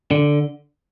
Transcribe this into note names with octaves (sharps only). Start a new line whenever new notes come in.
D3